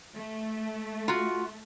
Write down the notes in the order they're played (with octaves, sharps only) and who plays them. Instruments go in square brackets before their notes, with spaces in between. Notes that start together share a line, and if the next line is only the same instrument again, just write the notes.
[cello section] A3
[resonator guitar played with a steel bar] F4 F#4